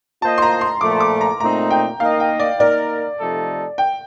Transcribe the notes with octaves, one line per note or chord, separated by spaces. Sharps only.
A#3 F4 C5 D#5 A5
C6
A#5
C6
A#2 F3 A3 D6
D6
A#5
A#2 A3 C4 D#4 A#5
G5
A#3 D#4 A#4 D#5 F5
G5
D5
A#3 D#4 A#4 D5
C3 F3 A3 D#4 A4
G5